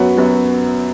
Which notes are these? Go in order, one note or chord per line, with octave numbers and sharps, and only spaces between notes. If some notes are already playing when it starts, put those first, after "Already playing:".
Already playing: F#2 F#3 B3 F#4
F#2 F#3 B3 F#4